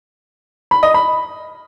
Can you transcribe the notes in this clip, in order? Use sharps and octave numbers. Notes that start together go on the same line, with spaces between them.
B5
D#5
B5